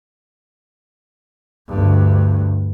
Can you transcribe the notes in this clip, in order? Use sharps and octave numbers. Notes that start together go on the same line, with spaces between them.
D2 G2